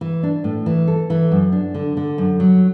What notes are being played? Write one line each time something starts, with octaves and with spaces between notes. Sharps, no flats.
E3
D4
A2
E3
A4
E3
F#2
D4
D3
D3
F#2
F#3